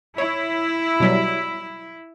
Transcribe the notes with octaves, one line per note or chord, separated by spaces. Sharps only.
E4 C#5
B2 F#3 G3